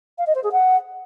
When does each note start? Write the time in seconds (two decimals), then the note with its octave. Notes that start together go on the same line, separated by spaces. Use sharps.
0.18 F5
0.27 D#5
0.35 C5
0.44 G#4
0.52 F#5